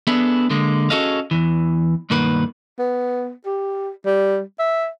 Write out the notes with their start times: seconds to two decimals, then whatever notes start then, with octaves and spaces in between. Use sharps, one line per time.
0.07 B3 D4 G#4 A4 B4 E5
0.50 D3 G#3 A#3
0.90 C#4 F#4 G#4 A4 D#5 F5
1.31 E2 E3
2.10 B1 G2 D#3 A#3 B4 F#5
2.79 B3
3.46 G4
4.06 G3
4.59 E5